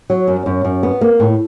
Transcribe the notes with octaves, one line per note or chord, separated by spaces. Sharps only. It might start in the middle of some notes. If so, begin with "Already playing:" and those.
F#3
F#2
F#2
F#2
B3
A#3
A2